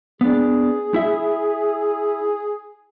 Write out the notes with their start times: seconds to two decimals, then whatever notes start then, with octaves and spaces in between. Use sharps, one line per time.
0.21 B3 D4 G#4
0.94 E4 E5